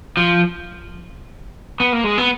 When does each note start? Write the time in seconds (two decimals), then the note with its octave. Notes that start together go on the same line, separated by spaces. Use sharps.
0.17 F3
1.80 B3
1.93 A#3
2.04 G#3
2.18 B3